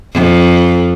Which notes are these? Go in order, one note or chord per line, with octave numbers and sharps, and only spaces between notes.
F2